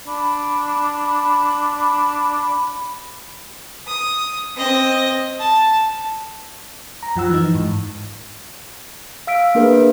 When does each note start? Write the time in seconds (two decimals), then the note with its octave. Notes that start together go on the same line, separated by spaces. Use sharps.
0.07 D4 B5
3.87 D#6
4.56 C4 D#5
5.39 A5
7.03 A#5
7.16 F#2 F3 F#5 E6
7.30 E3 D#4
7.55 G#2
9.27 F5 E6 B6 D7
9.55 A#3 D4 G#4 A#4 B4